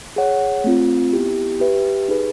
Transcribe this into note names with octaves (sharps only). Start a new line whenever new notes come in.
G#4 C#5 F#5
A3 C4 F4
B3 E4 G4
G4 B4 E5
D#4 G#4 B4